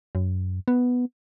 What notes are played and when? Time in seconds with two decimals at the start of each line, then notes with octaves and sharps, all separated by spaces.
0.15 F#2
0.68 B3